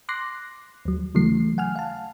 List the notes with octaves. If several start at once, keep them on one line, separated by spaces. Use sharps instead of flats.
C6 D6 F#6 A#6 C7
D#2 F#3
C#3 E3 F#3 A3 C7
F#5 G#5 F6
F5 A5